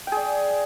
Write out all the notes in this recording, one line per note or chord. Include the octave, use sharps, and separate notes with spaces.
G#4 D5 G5